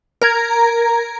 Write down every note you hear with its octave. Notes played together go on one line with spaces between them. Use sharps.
A#4 A#5 G#6